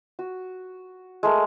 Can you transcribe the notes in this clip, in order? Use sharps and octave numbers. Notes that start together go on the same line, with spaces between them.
F#4
G#3 A3 A#4